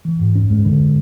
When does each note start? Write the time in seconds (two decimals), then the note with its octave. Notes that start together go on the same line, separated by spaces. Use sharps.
0.05 E3
0.19 G#2
0.35 C#4
0.50 G#3
0.65 D3